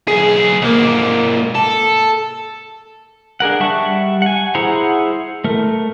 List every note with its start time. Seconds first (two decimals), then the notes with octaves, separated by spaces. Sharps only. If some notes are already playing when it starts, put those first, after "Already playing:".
0.08 B1 G#4
0.62 G#2 A#3
1.55 A4
3.40 D4 G#4 A#4 F#5
3.60 G3 E5 F#5 A5 C#6
4.22 F#5 G#5
4.55 E4 G#4 C5 F#5 A#5
5.44 A3 A#4